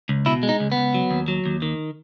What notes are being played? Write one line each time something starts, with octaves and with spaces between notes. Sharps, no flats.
C#2
B2 E4
G#3
D#4
C#2
B3
C#2
F#3
D#2
F#3
D#2
D#3